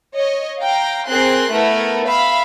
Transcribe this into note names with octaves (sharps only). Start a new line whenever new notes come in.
C#5 D#5
F5 G5 A#5
C4 G#4 A#4 C6 F#6
A3 B3 E4 A#4
E5 F5 B5